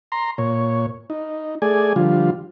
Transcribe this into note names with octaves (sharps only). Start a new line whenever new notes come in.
A#5 C6
A#2 C#5
D#4
A3 G#4 D5 G#5
D3 F3 G3 F4